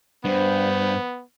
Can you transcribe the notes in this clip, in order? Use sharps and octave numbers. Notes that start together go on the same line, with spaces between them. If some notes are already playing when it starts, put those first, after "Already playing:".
G2 B3 C5